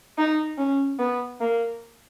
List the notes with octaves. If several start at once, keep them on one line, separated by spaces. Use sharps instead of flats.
D#4
C#4
B3
A#3